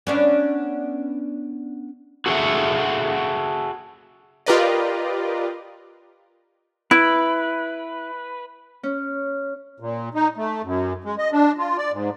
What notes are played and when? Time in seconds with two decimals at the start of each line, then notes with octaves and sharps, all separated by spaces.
0.07 B3 C#4 D4
2.26 F#4 G#4 A4 B4 E5 F#5
4.46 F4 G4 A#4 B4 D5 D#5
6.91 E4 B4
8.83 C#4
9.80 A#2
10.14 D#4
10.37 A3
10.63 F#2
11.04 G#3
11.18 D#5
11.32 D4
11.58 F4
11.77 D5
11.92 G#2